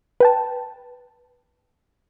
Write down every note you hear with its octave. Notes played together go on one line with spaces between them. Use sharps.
B4 G5 A5